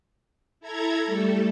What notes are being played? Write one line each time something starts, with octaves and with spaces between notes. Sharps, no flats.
E4 A4 A#5 G#6
G3 A3 A4